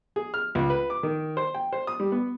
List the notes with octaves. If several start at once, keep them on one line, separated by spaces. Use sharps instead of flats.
G#4
F6
C#2
B4
D6
D#3
C5
G5
C5
D#6
G3
B3